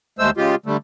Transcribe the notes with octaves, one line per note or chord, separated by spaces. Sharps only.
D#2 G#3 A3 C5 E6
C#3 G#3 F4 G4
D3 G3 A3